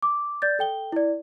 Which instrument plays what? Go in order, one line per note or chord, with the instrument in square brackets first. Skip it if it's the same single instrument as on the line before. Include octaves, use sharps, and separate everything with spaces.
[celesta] D6
D5 G6 A6
A4 G5 G7
E4 D5